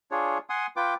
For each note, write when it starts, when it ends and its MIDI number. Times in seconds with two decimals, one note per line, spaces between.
0.11 0.38 62
0.11 0.38 65
0.11 0.38 68
0.11 0.38 73
0.49 0.66 78
0.49 0.66 80
0.49 0.66 84
0.49 0.66 87
0.76 0.94 65
0.76 0.94 71
0.76 0.94 79
0.76 0.94 86